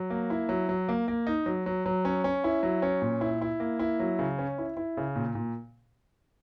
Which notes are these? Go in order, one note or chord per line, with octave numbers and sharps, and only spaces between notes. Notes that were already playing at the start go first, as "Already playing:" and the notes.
Already playing: F#3
A#3
E4
F#3
F#3
A#3
A#3
D#4
F#3
F#3
F#3
C#4
C#4
E4
F#3
C#4
A#2
E4
E4
A#3
E4
F#3
C#3
C#4
E4
E4
C#3
A#2
A#2